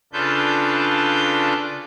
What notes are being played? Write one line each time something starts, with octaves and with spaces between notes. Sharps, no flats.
C#3 D4 F4 A4 B4 G6